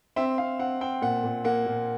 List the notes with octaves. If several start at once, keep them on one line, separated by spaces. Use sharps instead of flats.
C4 E5
C4 F5
C4 F#5
C4 G5
A#2 F#5
A#2
A#3 F#5
A#2